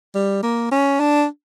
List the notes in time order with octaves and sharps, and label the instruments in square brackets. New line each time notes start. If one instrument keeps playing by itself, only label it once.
[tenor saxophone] G3
A#3
C#4
D4